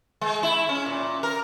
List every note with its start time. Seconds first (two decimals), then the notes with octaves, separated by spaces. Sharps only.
0.21 G#3
0.43 E4
0.69 C#4
0.86 A#2
1.23 A#4